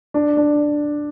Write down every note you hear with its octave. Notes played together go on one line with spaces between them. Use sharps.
D4
D4